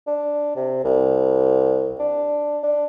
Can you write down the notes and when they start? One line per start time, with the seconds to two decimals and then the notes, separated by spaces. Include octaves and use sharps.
0.07 D4
0.56 C3
0.84 C2
1.99 D4
2.63 D4